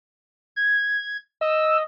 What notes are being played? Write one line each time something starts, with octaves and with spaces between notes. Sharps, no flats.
G#6
D#5 E6